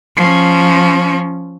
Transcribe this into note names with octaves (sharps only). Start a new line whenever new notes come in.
F3 C#4